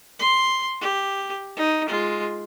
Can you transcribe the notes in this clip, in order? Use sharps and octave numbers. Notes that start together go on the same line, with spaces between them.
C6
G4
D#4
G#3 F4